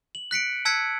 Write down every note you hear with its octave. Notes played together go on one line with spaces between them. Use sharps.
F#7
F#6 B6 C#7 D7
A5 E6 F#6 G#6 B6 C#7